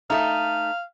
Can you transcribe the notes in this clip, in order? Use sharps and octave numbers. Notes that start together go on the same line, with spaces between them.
A3 D#4 F5